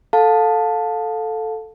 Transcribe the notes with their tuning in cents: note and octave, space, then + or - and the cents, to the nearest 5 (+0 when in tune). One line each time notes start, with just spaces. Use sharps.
A4 +0 F5 +30 A5 +0